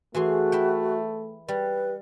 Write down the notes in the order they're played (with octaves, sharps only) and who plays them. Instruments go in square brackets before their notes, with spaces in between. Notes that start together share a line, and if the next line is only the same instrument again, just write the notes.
[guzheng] E3 G#4 C6 [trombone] A3 [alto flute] F#4
[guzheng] E4 E5 G5
[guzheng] G3 [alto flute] B4